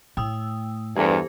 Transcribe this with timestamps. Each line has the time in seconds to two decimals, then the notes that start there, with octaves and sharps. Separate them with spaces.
0.17 A2 G5 D#6 E6
0.96 E2 G2 G4 A4 C5